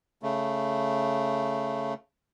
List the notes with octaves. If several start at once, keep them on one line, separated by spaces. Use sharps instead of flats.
C#3 A3